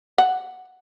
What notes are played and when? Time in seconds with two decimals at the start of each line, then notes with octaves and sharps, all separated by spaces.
0.18 F#5